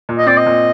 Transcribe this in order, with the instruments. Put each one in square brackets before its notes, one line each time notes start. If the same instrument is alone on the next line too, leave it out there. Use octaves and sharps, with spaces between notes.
[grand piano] A#2
[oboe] D#5
[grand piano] C4 [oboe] D5
[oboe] D#5
[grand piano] A#2